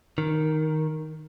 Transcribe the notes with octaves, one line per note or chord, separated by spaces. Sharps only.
D#3